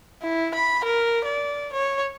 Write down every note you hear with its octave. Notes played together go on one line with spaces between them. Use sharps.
E4
B5
A#4
D5
C#5